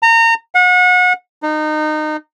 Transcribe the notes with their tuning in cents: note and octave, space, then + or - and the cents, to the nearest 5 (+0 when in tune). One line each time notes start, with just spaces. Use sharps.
A#5 -30
F#5 -35
D#4 -25